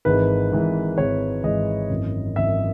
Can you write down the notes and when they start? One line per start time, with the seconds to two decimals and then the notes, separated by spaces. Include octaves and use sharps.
0.05 G#1 G#2 E3 G#3 B4
0.52 G#1 G#2 E3 G#3
0.98 G#1 G#2 E3 G#3 C#5
1.43 G#1 G#2 E3 G#3 D#5
1.90 G#1 F#2 E3
2.36 G#1 F#2 E3 E5